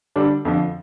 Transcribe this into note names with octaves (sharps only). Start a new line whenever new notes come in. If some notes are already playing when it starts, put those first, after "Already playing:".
D3 G3 D4 A4
F2 D3 F3